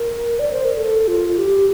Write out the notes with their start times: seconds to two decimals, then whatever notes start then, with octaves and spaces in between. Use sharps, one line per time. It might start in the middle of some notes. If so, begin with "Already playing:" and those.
Already playing: A#4
0.39 D5
0.52 C5
0.65 A#4
0.77 A4
1.08 F4
1.38 G4